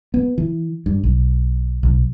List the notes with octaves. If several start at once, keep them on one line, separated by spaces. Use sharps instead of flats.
B3
E3
G2
B1
B1